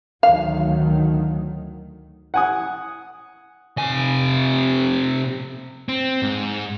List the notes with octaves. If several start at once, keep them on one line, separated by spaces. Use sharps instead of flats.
D2 D#3 F#3 F5
F#5 G#5 D#6
C3 G#5
C4
G#2